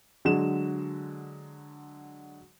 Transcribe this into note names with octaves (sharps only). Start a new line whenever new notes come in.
D3 F#3 G#3 E7